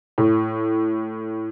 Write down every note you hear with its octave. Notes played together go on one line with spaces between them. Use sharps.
A2